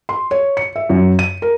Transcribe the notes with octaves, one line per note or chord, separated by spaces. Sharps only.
C6
C#5
C#7
E5
F#2
D#7
A#4